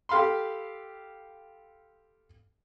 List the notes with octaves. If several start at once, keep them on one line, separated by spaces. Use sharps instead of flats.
G4 A4 F5 B5 C6